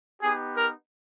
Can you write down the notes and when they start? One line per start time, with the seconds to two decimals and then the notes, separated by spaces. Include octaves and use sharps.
0.21 B3 D#4 G4 G#4
0.57 A#4